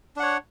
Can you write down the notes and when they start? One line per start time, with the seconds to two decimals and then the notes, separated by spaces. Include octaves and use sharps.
0.16 D4
0.19 F#5
0.23 C#5